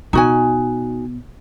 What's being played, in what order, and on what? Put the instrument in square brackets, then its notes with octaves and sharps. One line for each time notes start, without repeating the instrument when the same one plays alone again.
[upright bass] B2 [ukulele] D#4 F#4 G#5